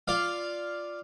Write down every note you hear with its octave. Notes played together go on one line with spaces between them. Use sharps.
F4 D5 F5